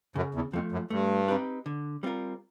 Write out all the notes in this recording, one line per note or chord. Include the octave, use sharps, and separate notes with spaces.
F#2 C#3
E2
F2 F3 A3
F#2
G2 A3
C4 D#4 G4 B4
D3
G3 C4 F4 A#4